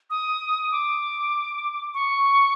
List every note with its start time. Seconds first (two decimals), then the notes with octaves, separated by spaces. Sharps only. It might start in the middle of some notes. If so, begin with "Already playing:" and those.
0.10 D#6
0.72 D6
1.94 C#6